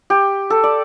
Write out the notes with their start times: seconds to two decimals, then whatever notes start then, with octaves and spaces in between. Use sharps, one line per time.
0.10 G4
0.50 A4
0.64 D5